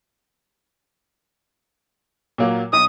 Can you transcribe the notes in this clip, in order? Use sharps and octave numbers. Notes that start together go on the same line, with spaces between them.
A#2 F#3 A#3
B1 D#6